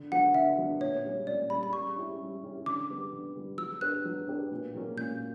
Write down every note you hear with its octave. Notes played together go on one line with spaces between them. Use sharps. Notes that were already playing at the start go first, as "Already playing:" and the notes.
Already playing: D3
F#3 B3 D4 F#5
D3 E5
F#3 B3 D4
A#2 C#5
G3 C#4
A#2 D5
G3 C#4 B5
B5
G3 C#6
C#4 E4 G4
G3
C#4 E4 G4
D3 D6
G3 B3
D3
G3 B3
F#3 E6
B3 D4 G4 B4 F#6
F#3
B3 D4 G4 B4
A#2
F#3 A#3 C#4
A#2 G6